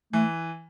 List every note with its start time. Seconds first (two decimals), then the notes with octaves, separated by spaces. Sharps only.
0.13 E3 A3